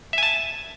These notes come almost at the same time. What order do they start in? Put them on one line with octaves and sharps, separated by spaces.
E5 G#5 A5